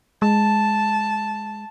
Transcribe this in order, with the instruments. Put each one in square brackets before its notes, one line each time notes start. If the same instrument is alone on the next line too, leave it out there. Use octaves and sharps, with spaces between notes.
[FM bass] G#3 [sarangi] A5